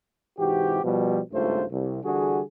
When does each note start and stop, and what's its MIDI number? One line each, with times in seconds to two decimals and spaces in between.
0.38 0.80 44
0.38 0.80 48
0.38 0.80 52
0.38 0.80 66
0.38 0.80 67
0.84 1.20 47
0.84 1.20 53
0.84 1.20 55
1.32 1.64 32
1.32 1.64 37
1.32 1.64 43
1.32 1.64 57
1.32 1.64 65
1.32 1.64 72
1.71 1.99 36
2.04 2.40 50
2.04 2.40 52
2.04 2.40 55
2.04 2.40 66
2.04 2.40 68